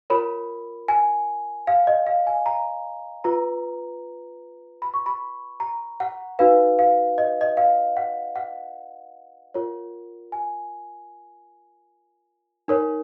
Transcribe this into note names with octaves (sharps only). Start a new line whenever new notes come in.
F4 A#4 C#5 B5
G#5
F5
D#5
F5
G#5
A#5
F4 B4 A#5
B5
C#6
B5
A#5
F#5
D#4 F#4 B4 F5
F5
D#5
D#5
F5
F#5
F#5
F4 A#4 C#5
G#5
D#4 A#4 C#5